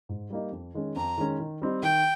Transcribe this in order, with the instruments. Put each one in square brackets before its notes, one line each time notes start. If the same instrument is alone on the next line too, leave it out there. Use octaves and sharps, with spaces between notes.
[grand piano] G#2
G3 A#3 D#4
F2
D#3 G#3 C#4
[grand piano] F2 [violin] A#5
[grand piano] D#3 G#3 C#4
D#3
G3 C4 D#4
[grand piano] D#3 [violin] G5